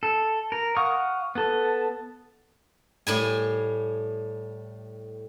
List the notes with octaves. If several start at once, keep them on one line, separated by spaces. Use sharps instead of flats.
A4
A#4
F5 F#5 C#6 D#6 F6
B3 A4
A2 G3 G#5